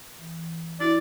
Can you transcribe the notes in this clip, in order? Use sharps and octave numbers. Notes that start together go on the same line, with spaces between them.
E3
E3
E4 F#4 D5 E5